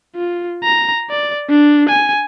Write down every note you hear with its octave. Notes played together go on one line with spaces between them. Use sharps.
F4
A#5
D5
D4
G#5